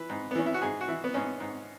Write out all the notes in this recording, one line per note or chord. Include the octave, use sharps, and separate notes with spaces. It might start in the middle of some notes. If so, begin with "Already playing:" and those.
Already playing: E3 B4
G#2
B3
E3 C#4
E4
F#4
G#2 G#4
F#4
E3 E4
B3
G#2 C#4
G#2